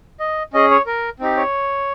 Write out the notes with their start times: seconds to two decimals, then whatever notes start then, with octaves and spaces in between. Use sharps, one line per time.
0.20 D#5
0.53 C#4 G#4 D#5
0.70 C#5
0.86 A#4
1.20 C4 D#4 G4
1.37 C#5